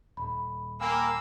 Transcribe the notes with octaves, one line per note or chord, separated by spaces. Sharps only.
D#1 B5
A#3 G5 G#5 B5 E6